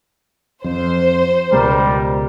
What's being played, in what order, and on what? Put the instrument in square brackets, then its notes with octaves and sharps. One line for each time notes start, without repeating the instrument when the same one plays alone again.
[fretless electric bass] F2 [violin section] C5
[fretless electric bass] C#2 B2 G#3 [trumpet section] G3 A#4